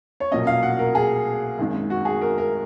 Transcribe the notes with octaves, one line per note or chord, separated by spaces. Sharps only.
C#5
B1 A#2 F#3 A#3 C#4 D#5
F5
F#5
A#4
G#4
G#1 F#2 D#3 G#3
F#4
G#4
A#4
A#4